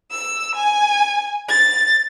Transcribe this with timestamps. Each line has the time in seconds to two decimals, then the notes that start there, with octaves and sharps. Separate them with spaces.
0.10 E6
0.55 G#5
1.48 A6